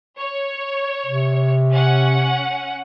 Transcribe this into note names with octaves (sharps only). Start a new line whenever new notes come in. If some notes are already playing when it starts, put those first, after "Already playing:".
C#5
C3
C#4 F#5